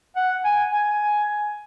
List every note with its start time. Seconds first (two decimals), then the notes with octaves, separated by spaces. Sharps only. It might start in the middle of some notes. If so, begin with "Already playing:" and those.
0.16 F#5
0.44 G#5
0.71 G#5